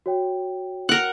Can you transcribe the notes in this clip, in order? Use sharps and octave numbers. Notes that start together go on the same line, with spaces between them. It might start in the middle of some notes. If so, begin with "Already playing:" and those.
F#4 C#5 G5
A#4 F#5